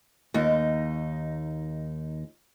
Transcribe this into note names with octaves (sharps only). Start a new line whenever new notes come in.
D#2 D#4